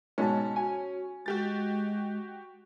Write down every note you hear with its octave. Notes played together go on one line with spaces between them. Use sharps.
G#2 B2 C#4 A5
F#4 G#5
G#3 F#4 G4 A6